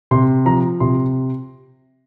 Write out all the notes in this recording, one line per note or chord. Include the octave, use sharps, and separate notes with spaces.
C3 C6
F3 A#5
C3 C6